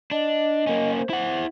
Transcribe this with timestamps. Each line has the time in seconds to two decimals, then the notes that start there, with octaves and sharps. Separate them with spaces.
0.11 D4 D#5
0.67 A#3 C#4
0.97 C5
1.10 E4 F#5